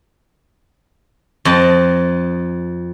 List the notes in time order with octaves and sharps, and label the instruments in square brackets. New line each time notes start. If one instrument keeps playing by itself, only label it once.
[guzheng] F2 D#5 A5